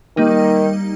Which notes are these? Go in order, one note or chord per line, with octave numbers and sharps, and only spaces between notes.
D#3 G3 A#3 D#4